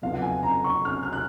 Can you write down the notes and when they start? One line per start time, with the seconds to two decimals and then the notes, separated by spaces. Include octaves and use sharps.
0.02 F#1 F2 F3 B3 F5
0.14 F#5
0.22 G#5
0.43 A#5
0.64 C#6
0.85 F6
1.03 F6
1.13 F#6